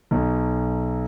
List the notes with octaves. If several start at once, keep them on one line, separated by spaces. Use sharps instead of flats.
B1